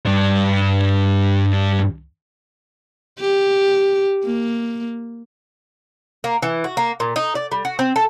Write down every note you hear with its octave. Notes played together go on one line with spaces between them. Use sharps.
G2 D4
G4
A#3
A#3
E3
F#4
A#3
A#2
D#4
D5
G3
F#4
C4
A4